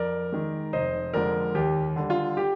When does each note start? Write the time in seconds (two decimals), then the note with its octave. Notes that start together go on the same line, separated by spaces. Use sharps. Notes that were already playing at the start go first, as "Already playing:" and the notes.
Already playing: F2 A#4 D5
0.32 D#3 G#3
0.73 F1 C5 D#5
1.14 F2 D3 F3 G#3 A#4 D5
1.55 D#2 G4
1.96 D3 G3
2.10 F4
2.37 G4